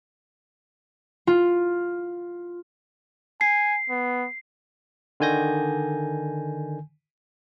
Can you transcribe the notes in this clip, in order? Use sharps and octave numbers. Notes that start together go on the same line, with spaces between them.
F4
G#5 C7
B3
D3 D#3 G#5 G6 A#6